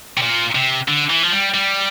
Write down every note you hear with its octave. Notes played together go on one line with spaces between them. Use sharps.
C3
A#2
C3
D3
E3
F3
G3
G3